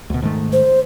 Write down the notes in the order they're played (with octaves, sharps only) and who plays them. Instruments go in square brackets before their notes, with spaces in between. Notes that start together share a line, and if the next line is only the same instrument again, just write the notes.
[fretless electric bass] D2 B2
G#2 D#3 A3
[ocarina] C5